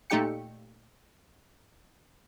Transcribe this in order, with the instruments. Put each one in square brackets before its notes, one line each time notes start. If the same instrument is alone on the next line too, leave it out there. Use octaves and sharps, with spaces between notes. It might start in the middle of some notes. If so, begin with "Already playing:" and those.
[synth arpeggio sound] A#2 A3 D#4 G4 G5 C#7